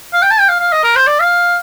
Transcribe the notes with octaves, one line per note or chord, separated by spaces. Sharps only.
F5
G5
A5
G5
F5
F5
D#5
A#4
C5
D5
F5